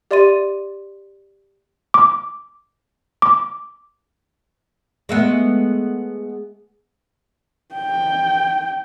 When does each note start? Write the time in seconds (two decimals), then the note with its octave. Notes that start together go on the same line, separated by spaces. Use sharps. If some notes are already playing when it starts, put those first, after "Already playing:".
0.11 G4 D5 E5 C6 A6 D#7
1.94 D6
3.22 D6
5.09 G#3 A3 B3
7.75 G5